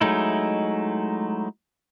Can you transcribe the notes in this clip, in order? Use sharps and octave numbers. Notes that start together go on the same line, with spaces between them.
F#3 G#3 A3 D#4 E4